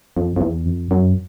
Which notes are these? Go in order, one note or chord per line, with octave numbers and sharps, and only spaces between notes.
F2
F2
E2
F2
F#2